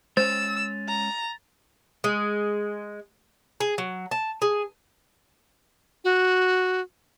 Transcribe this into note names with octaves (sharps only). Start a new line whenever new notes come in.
G#3 C#4 C5 C#5 E6 A6
A#5
G#3
G#4
F#3
A5
G#4
F#4